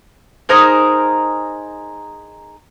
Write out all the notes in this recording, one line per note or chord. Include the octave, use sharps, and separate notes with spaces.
D#4 G#4 A#4 C5